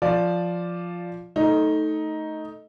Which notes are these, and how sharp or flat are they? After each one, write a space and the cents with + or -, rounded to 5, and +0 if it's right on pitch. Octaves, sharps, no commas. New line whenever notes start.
F3 +0 D5 +0
A3 +0 D#4 +10